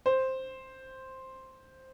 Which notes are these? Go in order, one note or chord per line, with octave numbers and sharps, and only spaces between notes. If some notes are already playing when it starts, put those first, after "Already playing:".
C5